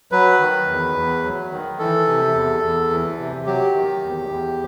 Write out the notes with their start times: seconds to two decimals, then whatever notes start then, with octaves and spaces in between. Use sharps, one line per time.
0.12 F#3 B4
0.40 D#3
0.67 E2
0.95 E2
1.24 F#3
1.51 D#3
1.79 E3 A4
2.07 C3
2.35 E2
2.63 E2
2.91 E3
3.18 C3
3.46 F#3 G4
3.74 D#3
4.03 E2
4.29 E2